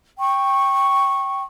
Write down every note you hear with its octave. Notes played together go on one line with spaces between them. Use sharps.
G5 C#6